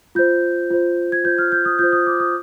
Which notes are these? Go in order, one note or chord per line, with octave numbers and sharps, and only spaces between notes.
F4 C5 G6
F4 C5
G#6
F4 C5 G6
F6
G6
D#6
F4 C5 G6
D#6
D6
D#6